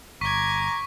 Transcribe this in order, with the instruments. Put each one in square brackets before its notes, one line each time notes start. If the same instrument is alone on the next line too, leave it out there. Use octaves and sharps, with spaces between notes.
[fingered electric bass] G1 [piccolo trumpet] A#5 [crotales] C#6 B6 [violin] D6 G#6